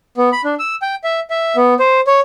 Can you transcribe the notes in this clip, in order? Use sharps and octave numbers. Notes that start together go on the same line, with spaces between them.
B3
B5
D4
E6
G5
E5
E5
B3
C5
C#5